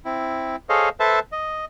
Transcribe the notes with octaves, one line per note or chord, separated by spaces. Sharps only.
C4 E4
G#4 A4 C5 C#5 D#5 F5
A4 B4 C5 E5 A5
D#5